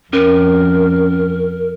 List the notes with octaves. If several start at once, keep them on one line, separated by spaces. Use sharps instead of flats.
F2 C#4 A#4